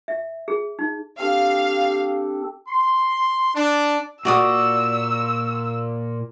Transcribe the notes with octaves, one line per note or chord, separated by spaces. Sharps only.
E5
G#4
D#4
C4 D4 G4 A4 F5
C6
D4
A#2 F#4 D5 D#6 E6